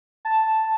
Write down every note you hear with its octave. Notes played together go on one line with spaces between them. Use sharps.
A5